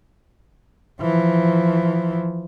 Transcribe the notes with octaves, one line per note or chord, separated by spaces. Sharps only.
E3 F3